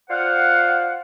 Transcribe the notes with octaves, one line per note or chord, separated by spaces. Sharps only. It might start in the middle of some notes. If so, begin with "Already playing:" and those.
F4 C5 D5 F5 F#5